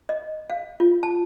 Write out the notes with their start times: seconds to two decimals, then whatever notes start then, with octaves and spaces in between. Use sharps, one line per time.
0.09 D#5
0.50 F5
0.80 F4
1.03 A5